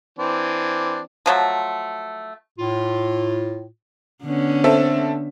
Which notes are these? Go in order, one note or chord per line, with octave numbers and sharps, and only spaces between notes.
E3 C4 D4
F3 F#3 A3
A2 F4
D3 B3 C#4
C4 A4 E5